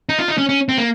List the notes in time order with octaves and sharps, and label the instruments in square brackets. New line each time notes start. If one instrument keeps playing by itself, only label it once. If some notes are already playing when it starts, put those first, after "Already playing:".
[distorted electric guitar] D#4
F4
D#4
C#4
C#4
C4
A#3